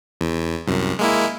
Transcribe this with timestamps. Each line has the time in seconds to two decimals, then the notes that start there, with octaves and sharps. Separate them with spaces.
0.21 E2
0.67 C2 F#2
0.99 G#3 A#3 E4